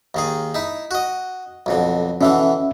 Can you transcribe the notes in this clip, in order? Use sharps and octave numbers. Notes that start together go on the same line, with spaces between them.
D#2 D#3 G#4
D#4 E4
F#4 D#5
B1 F2 D3
B2 D3 E3 C#4 E5